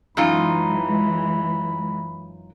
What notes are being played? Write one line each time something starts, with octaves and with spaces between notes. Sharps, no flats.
F#2 E3 G#3 D#4 F4 B5